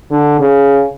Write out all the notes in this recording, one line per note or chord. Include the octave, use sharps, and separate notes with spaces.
D3
C#3